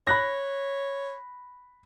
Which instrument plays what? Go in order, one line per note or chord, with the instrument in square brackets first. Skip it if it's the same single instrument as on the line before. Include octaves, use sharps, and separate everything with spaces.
[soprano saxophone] C#5 [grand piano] B5 F#6 A#6